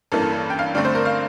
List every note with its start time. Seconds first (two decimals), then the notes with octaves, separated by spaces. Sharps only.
0.12 A1 G2 E3 A#3 A4
0.22 A4
0.33 A4
0.50 G5
0.59 F5
0.75 G2 D3 A3 C4 D5
0.85 C5
0.95 A#4
1.05 F5